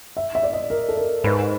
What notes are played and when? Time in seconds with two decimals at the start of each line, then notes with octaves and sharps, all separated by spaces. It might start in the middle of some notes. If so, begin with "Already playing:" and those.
0.17 E5
0.35 E5
0.43 D5
0.53 D#5
0.70 A#4
0.89 A4
0.97 A#4
1.24 G#2 B4